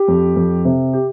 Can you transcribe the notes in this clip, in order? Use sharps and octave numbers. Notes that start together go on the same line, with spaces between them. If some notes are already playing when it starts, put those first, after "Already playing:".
Already playing: G4
F2
F2
C3
G4